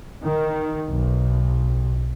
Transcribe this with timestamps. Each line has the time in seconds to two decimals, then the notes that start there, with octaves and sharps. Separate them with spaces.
0.24 D#3
0.90 B1